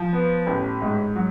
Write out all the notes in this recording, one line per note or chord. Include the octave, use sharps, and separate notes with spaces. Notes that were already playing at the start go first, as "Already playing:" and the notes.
Already playing: F3
B3
A1
G#2
F#3